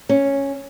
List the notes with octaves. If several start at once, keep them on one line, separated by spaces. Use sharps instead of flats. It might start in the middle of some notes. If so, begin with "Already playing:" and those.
C#4